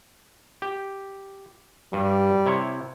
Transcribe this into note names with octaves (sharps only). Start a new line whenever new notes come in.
G4
G2 G3
C3 E4 C#5